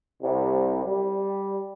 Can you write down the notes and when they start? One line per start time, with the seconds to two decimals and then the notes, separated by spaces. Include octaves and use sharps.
0.23 C2
0.85 G3